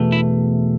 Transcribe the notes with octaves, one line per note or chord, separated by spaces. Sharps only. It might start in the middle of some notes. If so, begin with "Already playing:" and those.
Already playing: E2 B2 A3
E4